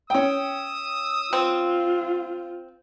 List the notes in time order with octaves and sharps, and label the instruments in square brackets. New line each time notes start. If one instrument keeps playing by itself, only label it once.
[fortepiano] C#4 G5 [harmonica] D#6 E6
[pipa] C4 [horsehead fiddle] F4